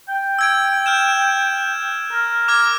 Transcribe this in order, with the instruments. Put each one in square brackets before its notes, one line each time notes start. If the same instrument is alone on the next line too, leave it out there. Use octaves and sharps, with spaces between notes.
[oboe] G5
[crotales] E6 G#6 D7
F6 G6 E7
[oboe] A#4
[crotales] D6 F6 G#6